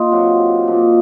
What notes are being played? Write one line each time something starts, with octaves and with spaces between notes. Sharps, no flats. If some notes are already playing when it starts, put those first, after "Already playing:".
Already playing: A#3 D#4 F4
C3 F#3
A#2 F3 D#4